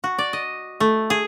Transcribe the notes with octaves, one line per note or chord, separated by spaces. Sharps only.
F#4
D5
D#5
A3
G#4